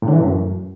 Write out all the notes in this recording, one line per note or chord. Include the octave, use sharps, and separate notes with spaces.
A2
D3
E3
A2
F#2